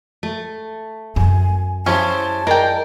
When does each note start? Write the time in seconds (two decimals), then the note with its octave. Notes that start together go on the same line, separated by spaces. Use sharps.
0.23 A3
1.16 F#2 F#3 G#5
1.86 C#3 G#3 C#4 E4 G4 C5 A5
2.47 G#3 A#4 D5 G5